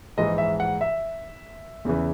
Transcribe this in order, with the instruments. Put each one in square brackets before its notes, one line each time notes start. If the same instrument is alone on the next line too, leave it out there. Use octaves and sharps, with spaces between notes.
[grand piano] A#1 G#2 E3 G#3 D#5
E5
F#5
E5
E2 C#3 E3